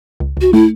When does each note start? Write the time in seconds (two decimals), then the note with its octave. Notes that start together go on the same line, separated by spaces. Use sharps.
0.20 C#2
0.37 C#2 F#4
0.53 A3 E4